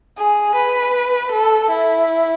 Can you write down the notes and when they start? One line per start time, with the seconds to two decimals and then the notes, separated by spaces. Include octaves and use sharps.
0.17 G#4
0.56 B4
1.32 A4
1.71 E4